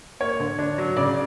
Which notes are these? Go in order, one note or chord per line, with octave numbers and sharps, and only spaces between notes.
A#3 C#5
D3
D4
F#3
C#3 D5